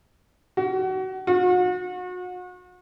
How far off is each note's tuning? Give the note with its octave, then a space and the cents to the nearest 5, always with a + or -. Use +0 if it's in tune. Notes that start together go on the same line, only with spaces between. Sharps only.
F#4 +30
F#4 -35